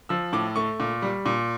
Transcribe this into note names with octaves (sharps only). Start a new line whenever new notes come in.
F3 E6
A2 D6
A3 C#6
A#2
G3
A#2